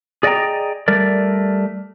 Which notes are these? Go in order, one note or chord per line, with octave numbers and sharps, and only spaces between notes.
G#4 D5 D#5 F#5 G5 A#5
G3 A3 A#4 D5